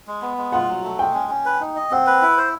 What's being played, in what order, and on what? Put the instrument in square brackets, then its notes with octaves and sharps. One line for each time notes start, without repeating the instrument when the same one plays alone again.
[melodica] G#3
B3
G#3
[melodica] F4 [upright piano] F#5
[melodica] F#3
A3
[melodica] G#3 [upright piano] G5
[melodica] C#4
C#4
B4
D#4
D#5
[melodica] C4 [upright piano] F#5
[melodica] B4
E4
C5